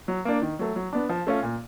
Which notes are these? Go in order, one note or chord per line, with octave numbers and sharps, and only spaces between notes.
F#3
A#3 D4
D#3
F#3 A3
F#3
B3 D4
F3
A3 C#4 F4
A#2